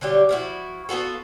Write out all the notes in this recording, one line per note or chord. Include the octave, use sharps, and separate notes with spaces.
D3 F#3 G3 G4
F3 E4 F#4
B3 F4 F#4 A4